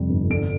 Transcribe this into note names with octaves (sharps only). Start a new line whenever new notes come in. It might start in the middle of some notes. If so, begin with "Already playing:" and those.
Already playing: F2 C3 G3
G1
D3 D7